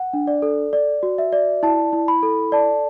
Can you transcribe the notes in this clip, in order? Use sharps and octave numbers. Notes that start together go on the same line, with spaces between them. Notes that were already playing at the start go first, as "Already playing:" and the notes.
Already playing: F#5
D4
D5
A4
D5
F#4
E5
D5
E4 A5
E4
B5
A4
D5 A5